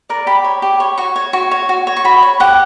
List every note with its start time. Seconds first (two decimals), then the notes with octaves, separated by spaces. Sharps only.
0.09 A#4 D5
0.27 G4 B5
0.44 C#5
0.62 G4
0.80 C#5
0.98 F#4 C#6
1.16 C#5
1.33 F#4 C#6
1.51 C#5
1.69 F#4
1.87 C#5
1.97 C#6
2.04 F#4 B5
2.23 C#5
2.40 G4 F#5